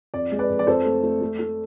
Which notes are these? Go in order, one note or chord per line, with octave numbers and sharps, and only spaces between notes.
F2 D5
G#3
B4 D5
F2
D5
F2 A4 C5
A3
A3
A3
A3